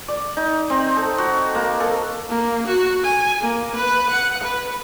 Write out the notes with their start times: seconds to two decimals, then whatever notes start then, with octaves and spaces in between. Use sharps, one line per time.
0.08 D5
0.37 D#4
0.70 C4
0.96 A4
1.18 F#4
1.55 A#3
1.80 A4
2.29 A#3
2.67 F#4
3.03 G#5
3.40 A#3
3.76 B4
4.10 F#5
4.43 B4